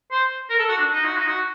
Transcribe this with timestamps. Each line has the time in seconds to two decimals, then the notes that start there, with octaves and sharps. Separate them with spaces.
0.11 C5
0.50 A#4
0.59 A4
0.69 F#4
0.78 D4
0.92 D#4
1.05 F#4
1.17 D#4
1.28 F#4